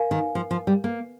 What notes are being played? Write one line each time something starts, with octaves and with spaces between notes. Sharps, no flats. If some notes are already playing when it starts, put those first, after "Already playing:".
Already playing: A#4 F5 G#5
D#3
F3
F3
G3
A#3